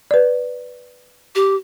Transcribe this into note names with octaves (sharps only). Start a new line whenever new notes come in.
B4 D5
G4